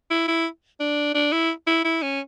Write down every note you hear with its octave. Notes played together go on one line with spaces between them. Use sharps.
E4
E4
D4
D4
E4
E4
E4
C#4